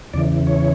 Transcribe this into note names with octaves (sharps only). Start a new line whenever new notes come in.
E2 C#3 E3 D5
C#5